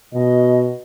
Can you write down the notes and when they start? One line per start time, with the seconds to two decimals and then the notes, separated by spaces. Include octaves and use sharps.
0.13 B2 D#5